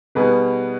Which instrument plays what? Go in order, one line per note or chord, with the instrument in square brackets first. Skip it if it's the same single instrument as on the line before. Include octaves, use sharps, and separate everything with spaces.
[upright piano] B2 G3 B3 D#4 G#4 [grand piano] B4